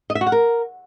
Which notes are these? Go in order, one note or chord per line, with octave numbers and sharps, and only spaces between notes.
D#5
E5
F#4
F#5
A#4